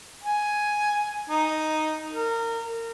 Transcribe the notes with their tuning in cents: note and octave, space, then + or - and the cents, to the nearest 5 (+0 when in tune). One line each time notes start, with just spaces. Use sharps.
G#5 +5
D#4 +0
A#4 -25